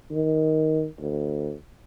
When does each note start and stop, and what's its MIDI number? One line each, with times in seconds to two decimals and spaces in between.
0.11 0.87 51
0.99 1.54 38